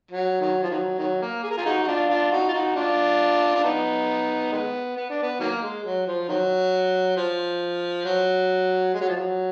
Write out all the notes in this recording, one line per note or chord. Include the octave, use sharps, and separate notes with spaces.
F#3
D#3 F#3
F3
D#3 F#3
D#3 F#3
A#3
G#4
A#4
F4 G#4
D#4 F#4
F#4
D4 F4
D4 F4
D#4 F#4
F4
D#4 F#4
D4 F4
D4
B3 D#4
D#3 G#3 B3
B3
D4
B3
D#3 F#3 A#3
G#3
F#3
F3
D#3 F#3
F3
F#3
G#3
F#3
F3
F#3